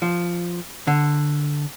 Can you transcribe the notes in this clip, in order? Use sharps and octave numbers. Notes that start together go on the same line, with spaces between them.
F3
D3